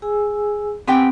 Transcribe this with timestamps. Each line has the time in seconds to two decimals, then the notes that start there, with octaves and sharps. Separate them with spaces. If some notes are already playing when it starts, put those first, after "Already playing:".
0.02 G#4 G#5 E6
0.88 B3 C4 G4 G5 G#5